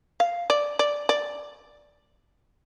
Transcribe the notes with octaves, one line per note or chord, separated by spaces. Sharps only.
F5
D5
D5
D5